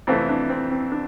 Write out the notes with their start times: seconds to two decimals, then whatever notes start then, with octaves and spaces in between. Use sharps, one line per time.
0.07 F2 C3 E3 A3 C4
0.29 D4
0.49 C4
0.71 C4
0.92 D4